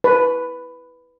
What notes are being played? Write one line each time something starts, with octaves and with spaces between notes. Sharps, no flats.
B4